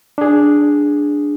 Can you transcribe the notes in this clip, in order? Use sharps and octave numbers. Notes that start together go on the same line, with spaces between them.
D4 G#4